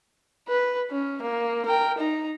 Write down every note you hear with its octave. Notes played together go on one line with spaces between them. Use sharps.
B4
C#4
A#3
A#4 G5
D#4 A#5